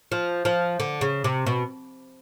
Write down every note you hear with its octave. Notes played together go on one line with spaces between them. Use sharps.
F3
F3
D3
C#3
C3
B2